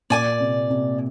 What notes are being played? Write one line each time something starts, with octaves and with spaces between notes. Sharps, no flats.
A#2 D5 G#5 D6
C3
C3